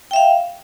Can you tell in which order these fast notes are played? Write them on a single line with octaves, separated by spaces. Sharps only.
G5 E5 F5